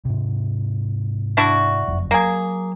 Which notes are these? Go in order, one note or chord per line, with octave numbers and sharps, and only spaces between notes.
G#2 C3
D4 E4 F#4
F#1 F2
F#3 A#3 G#4